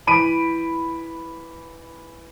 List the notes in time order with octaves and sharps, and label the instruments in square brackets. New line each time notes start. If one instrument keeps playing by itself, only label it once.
[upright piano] E3 B5 D7 D#7